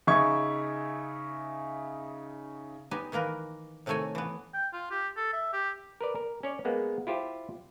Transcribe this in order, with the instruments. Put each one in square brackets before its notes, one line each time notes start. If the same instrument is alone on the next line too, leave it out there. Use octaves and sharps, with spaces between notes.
[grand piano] C#3 D#4 E5 C#6 G#6
[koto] B3 D#4 G4 G#5
D#3 E3 A#3 A#4 B4
A2 C3 D#3 A3 C#5 G#5
E3 B3
[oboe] G5
F4
G4
A4
E5
G4
[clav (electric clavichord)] A#4 B4 D5
A#4
C#4 C#5 D5
G#3 A#3 B3
E4 F4 G4 C5